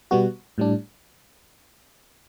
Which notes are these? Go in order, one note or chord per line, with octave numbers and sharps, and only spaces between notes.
B2 G3 B3 F#4
A2 G3 D4